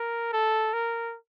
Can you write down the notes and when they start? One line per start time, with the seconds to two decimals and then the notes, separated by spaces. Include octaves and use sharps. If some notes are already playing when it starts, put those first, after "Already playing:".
Already playing: A#4
0.33 A4
0.73 A#4